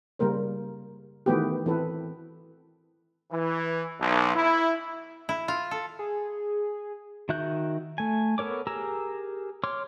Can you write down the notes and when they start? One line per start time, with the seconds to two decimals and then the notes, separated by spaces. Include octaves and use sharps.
0.19 C#3 G3 A#3 A#4 C5
1.26 D#3 E3 A3 B3 F#4 G4
1.66 E3 C4 A4 B4
3.31 E3
4.01 B1
4.35 E4
5.29 E4
5.48 F4
5.71 A4
5.99 G#4
7.29 D#3 F#4 E5 F#6 G6
7.98 A3 G#5
8.38 B3 A4 A#4 C#5 D6
8.67 G4 G#4 A#4 A#5 E6
9.64 C#5 C6 D6 F6